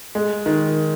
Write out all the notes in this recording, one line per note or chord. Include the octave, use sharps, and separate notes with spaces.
G#3
D#3